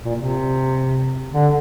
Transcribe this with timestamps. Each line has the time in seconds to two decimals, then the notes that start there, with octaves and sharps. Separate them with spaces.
0.05 A#2
0.15 C3
1.33 D3